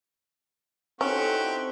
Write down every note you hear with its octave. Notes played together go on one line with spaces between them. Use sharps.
C4 C#4 D#4 E4 F#4 G4 A4